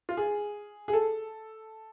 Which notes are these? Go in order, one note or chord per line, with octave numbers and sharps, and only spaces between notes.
F4
G#4
G#4
A4